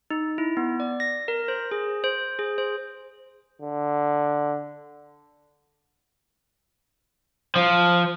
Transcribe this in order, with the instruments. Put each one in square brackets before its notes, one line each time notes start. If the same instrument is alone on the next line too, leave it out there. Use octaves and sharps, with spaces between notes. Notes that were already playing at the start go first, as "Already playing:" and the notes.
[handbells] D#4
E4
B3
D5
A#6
A#4
C5
G#4
C5
G#4
C5
[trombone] D3
[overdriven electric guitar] F3